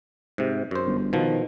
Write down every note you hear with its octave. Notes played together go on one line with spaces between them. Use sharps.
G#2 C3
F#2 C5
G1
B2 D#3 F3